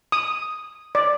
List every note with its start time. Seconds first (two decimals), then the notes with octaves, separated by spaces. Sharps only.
0.12 D#6
0.95 D5